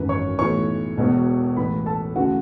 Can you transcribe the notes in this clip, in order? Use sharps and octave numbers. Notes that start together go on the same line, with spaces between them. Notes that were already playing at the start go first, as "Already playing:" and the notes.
Already playing: G#1 F#2 E3 B4
C#5 C#6
B1 A2 E3 C#5 C#6
E1 E2 B2
A1 A2 E3 B4 B5
A4 A5
D2 C#3 E3 F#4 F#5